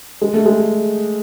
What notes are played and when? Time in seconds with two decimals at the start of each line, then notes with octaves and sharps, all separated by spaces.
0.21 G#3
0.33 A3
0.45 G#3